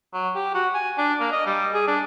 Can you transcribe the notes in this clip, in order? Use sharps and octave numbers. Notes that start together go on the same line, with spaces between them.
F#3
G4
F#4
G#5
D4
A#3
D#5
G3
G#4
D4